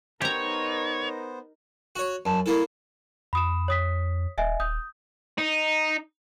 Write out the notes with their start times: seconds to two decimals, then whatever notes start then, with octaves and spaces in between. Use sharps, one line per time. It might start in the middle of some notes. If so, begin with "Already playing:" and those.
0.22 B3 D#4 G4 A#4 C5 C#5 A#5
1.96 F#4 C#5
2.26 F#2 A5
2.46 A#3 E4 A4
3.33 F2 B5 D#6 E7
3.68 C#5 D#6 B6
4.38 D#1 D#5 E5 G#5
4.60 D#1 D#6 G6
5.38 D#4